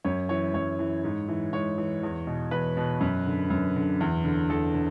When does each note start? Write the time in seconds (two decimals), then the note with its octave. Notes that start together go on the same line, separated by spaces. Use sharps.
0.05 F#2 C#5
0.29 E3 C#5
0.54 F#2 C#5
0.79 E3
1.04 G#2
1.29 E3
1.53 G#2 C#5
1.78 E3
2.03 E2
2.27 B2
2.51 E2 B4
2.77 B2
3.01 F#2
3.26 D3
3.50 F#2
3.76 D3
4.00 E2
4.25 D3
4.49 E2 A4
4.74 D3